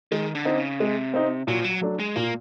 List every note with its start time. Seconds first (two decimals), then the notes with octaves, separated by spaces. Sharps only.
0.12 D#3 G#3
0.35 D3
0.45 C4 D#4
0.58 C#3
0.80 C3 G#3
1.14 C4 D#4
1.47 A#2 F#3
1.60 F3
1.64 F#3
1.81 F#3 A3 D4
1.99 G#3
2.16 A#2 A#3